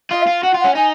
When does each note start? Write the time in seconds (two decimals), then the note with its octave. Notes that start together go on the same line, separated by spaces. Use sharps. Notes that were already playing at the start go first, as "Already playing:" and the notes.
0.11 F4 D#5
0.22 F5
0.27 F4
0.43 F#4 F#5
0.54 F4
0.59 C#4 F#5
0.75 D#4 G#5